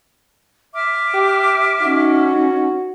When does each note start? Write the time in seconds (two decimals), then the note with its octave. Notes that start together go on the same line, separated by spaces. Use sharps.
0.75 E5 D6 F6
1.14 G4
1.82 C#4 D#4 F#4